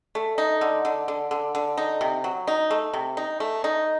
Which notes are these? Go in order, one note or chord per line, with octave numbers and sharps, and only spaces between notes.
A3
D#4
D3
D3
D3
D3
D3
D#4
C3
F#3
D#4
A3
C3
D#4
A3
D#4